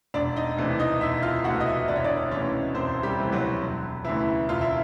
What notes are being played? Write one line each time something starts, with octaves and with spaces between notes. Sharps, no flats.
E1 D4 D5
D#4 D#5
D2 C3 E3
D#4 D#5
E1 E4 E5
F4 F5
D2 C3 E3 F#4 F#5
D#5
E4 E5
E1 D5
C#5
D4 D5
D2 C3 E3 C#4 C#5
E1 C4 C5
G3 G4
D2 C3 E3
F#3 F#4
E1
D2 C#3 E3 E4
E1 F4
E4